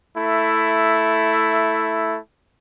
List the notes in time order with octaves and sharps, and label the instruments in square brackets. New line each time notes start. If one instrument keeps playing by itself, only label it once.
[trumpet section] A3 E4